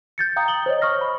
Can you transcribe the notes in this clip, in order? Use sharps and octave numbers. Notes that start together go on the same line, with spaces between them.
G6 A6 C#7
F5 G5 A#5 D#6
D#6 F#7 G7
C5 C#5 D#5
C#6 D#6 F6 A#6
B5